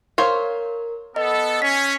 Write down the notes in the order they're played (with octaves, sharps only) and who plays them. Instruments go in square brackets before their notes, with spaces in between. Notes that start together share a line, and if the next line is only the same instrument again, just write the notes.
[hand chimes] A#4 [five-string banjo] C5 C#5 F5
[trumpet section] B3 A4 [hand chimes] D#5
[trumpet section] C#4 [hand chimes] B6